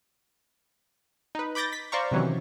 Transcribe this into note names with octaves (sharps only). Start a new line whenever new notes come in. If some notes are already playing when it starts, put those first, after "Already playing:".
D#4 B4
B5 D6 G6 A6 A#6
B6
C5 D5 F5 A#5 C#6
C3 D#3 E3 F#3 C#4